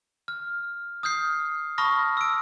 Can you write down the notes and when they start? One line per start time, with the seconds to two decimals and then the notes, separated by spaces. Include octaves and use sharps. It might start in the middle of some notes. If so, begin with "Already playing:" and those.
0.28 F6
1.03 D#6 F6 G6 C7
1.78 A5 B5 C#6 D#6 F6 A#6
2.17 E6 D7